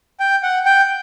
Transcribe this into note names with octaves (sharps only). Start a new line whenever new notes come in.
G5
F#5
G5